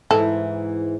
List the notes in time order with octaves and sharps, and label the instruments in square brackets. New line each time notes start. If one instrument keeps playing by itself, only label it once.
[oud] G#2 E3 E4 [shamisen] A4